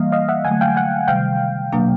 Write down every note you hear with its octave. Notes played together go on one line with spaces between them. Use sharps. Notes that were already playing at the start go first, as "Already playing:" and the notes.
Already playing: E3 G3 A#3 D#5 F5
D#5 F5
E5 F#5
D3 F#3 A3 F#5 G#5
F5 G5
F#5 G#5
C3 D#3 G3 F5 G5
B2 F#3 A#3 D4